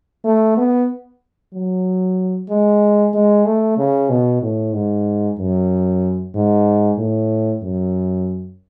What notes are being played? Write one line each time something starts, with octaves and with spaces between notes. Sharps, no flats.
A3
B3
F#3
G#3
G#3
A3
C#3
B2
A2
G#2
F#2
G#2
A2
F#2